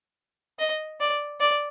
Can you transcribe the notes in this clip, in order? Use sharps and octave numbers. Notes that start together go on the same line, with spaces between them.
D#5
D5
D5